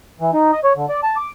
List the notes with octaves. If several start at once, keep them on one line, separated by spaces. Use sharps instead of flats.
E3
D#4
D#5
C#5
D3
D5
A5
D6